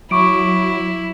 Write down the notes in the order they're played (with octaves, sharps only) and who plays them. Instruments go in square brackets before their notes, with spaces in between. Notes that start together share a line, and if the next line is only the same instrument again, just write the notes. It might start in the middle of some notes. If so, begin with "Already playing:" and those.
[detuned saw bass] F#3 [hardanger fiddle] E4 [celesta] C#6 D6 D7